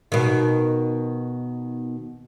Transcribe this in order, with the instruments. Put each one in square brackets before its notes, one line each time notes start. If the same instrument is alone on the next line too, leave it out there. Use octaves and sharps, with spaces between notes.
[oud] B2 D#3